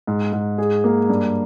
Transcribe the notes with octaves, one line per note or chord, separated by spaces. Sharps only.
G#2
G#2
G#4
A#3
G2